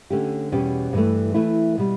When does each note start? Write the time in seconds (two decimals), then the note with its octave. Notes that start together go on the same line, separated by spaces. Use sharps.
0.10 D3 A3 C#4 G4
0.52 E2 B2 G3 C#4 G4
0.93 G2 E3 A3
1.34 E3 A3 E4
1.78 B2 G3